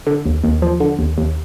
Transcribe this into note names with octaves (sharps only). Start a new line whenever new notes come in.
D3
D#2
D#2
F3
D3
D#2
D#2